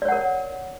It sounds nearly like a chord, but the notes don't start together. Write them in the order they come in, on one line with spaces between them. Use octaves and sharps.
D5 C#5 F#5 A#4